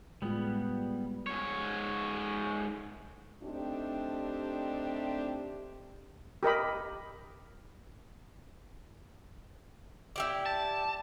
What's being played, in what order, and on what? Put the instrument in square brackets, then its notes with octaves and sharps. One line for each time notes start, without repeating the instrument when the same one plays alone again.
[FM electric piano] A2 G#3 F4 [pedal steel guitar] G3 B3
[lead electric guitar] G#2 C#5
[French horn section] A3 C4 D4 D#4 G4
[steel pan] G4 A#4 D#5 B5
[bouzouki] E4 G4 D5
[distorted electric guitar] A5